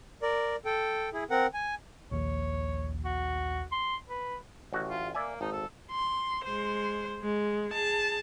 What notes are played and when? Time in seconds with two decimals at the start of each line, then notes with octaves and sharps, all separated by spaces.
0.22 A#4 D5
0.65 A4 G5
1.13 E4 G#4
1.30 C4 A#4 F#5
1.54 G#5
2.11 A#1 D#2 C#5
3.05 F#4
3.72 C6
4.09 B4
4.73 A1 F#4
4.89 F4
5.14 A#3 D5 E5 G#5
5.41 G#1 D#4 A5
5.52 A4
5.91 C6
6.45 G#3 C5
7.22 G#3
7.69 G#4 A5